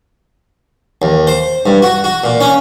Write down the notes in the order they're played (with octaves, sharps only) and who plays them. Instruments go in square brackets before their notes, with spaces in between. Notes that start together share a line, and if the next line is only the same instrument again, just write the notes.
[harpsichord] D#2
C5
G2
F#4
F#4
A#2
C#4